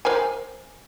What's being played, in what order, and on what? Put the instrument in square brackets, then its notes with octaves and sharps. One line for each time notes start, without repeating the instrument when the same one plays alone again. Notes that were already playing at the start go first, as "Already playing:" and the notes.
[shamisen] A#4 C5 G#5